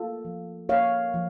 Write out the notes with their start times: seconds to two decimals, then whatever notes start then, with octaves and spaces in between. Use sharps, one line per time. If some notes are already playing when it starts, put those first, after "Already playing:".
Already playing: A#3 F4 A4
0.25 F3
0.69 A#3 C#5 F5
1.14 F3